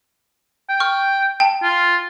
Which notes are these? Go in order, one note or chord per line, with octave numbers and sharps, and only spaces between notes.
G5
C#6 F6
G5 A5
F4